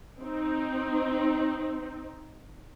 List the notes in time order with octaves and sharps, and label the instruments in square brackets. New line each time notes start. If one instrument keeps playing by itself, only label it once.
[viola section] C4 D#4